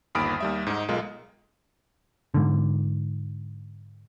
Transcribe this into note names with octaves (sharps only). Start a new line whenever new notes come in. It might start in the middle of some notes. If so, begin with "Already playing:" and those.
G1 D#2 B5 D#6 F6 D7
D#2 G3 E5
G#2 D#4
B1 G#3 F4 A#4
G#2 D3